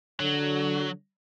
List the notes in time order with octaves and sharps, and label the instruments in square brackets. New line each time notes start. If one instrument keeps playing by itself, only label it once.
[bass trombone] D3 [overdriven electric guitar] F#3